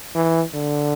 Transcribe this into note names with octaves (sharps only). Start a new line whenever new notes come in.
E3
D3